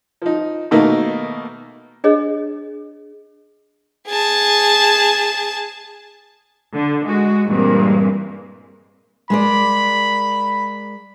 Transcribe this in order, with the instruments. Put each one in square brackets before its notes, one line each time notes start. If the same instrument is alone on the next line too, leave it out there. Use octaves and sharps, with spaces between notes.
[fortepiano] F3 D#4
B2 D#3 A3 A#3 D#4
[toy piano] D4 G#4 C#5 D#5
[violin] G#4 A5
[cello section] D3
G#3 F#4
G2 A#2 E3 G#3 A#3 C4
[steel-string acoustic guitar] G#3 A#4 D5 [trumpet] B5